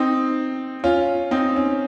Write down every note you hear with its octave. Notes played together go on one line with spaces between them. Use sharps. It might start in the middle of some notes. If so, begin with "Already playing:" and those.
Already playing: C4 D#4
C#4 F4
C4 D#4
C#4